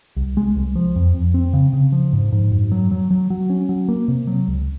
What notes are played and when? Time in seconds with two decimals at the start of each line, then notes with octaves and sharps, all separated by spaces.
0.16 C2
0.37 G#3
0.56 C2
0.76 F3
0.96 F2
1.15 F2
1.34 C4
1.54 C#3
1.73 C#3
1.92 F3
2.13 G#2
2.32 G#2
2.51 F#2
2.72 F#3
2.91 F#3
3.11 F#3
3.30 F#3
3.50 C#4
3.69 F#3
3.89 A#3
4.08 C3
4.27 F#3
4.48 C#2